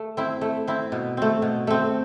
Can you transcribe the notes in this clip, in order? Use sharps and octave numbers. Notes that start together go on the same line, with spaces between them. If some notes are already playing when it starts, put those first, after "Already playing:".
Already playing: A3
C4 E4
A3
C4 E4
B2
A3 C4
B2
A3 C4